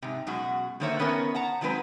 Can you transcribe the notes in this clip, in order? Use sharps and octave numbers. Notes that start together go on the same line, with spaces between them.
G#2 C3
F#2 B2 G#3 F#4
D3 D#3 A#3 C5 C#5 E5
D#3 B3 C#4 A#4 C#5
F#5 A5 A#5
D#3 F#3 G#3 C4 B4